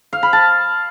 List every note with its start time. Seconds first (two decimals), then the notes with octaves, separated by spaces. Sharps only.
0.13 F5
0.23 B5
0.33 A5